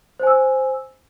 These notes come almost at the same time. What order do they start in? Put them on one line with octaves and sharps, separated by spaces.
C5 G#5 E6